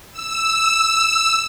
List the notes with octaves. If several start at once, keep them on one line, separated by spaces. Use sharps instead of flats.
E6